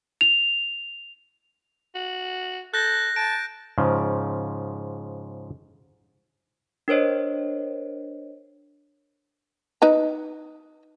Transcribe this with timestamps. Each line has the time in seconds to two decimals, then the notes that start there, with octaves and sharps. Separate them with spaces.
0.21 F7
1.95 F#4
2.74 A4 F#6 G6 A#6
3.16 A5 D7
3.78 G#2 C#3 F3
6.88 D4 A#4 C5 C#5 D#5
9.82 D#4 B4 A#5